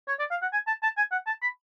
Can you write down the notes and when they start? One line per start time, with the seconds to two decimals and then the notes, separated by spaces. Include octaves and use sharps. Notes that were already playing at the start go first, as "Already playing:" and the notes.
0.08 C#5
0.19 D5
0.31 F5
0.42 F#5
0.53 G#5
0.67 A5
0.83 A5
0.97 G#5
1.12 F#5
1.27 A5
1.42 B5